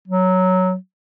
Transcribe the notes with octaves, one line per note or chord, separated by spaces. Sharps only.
F#3